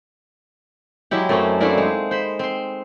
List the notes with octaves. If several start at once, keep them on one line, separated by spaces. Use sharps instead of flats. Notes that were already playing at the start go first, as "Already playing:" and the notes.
F#3 G#3 E4 G4
F#2 A3 C4 C#4
A3 A#3 C4 D4 E4 A#4
G#3 D#4
C5 B5
C4 C6